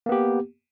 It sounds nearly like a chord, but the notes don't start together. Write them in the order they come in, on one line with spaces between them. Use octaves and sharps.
A#3 B3 G4